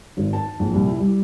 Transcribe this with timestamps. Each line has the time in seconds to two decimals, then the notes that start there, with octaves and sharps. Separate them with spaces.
0.17 G#1
0.33 A5
0.59 A#1
0.73 C2
0.87 E4
0.99 G3